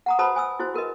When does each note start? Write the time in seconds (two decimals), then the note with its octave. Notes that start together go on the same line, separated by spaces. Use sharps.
0.06 F#5 A#5 D#6
0.18 F#4 B4 C5 A5 B5 D#6
0.35 C5 G#5 D#6 E6
0.59 E4 F#4 C5
0.74 F#4 A#4 B4 D#5